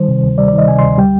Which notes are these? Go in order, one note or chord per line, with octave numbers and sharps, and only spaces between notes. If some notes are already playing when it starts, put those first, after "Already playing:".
Already playing: D#3 G3 C5
C3
D2
G3 D5
D5
D#3 D#5
C3 G#5
C6
D2
G3 G5